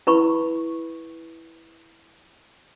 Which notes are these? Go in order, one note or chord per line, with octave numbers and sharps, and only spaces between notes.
E4 B4 B5 C#6